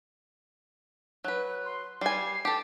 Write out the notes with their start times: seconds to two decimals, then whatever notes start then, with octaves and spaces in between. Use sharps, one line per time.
1.24 F#3 B4 F#6
1.65 C6
2.01 G3 G#5 C7
2.45 G4 A4 A5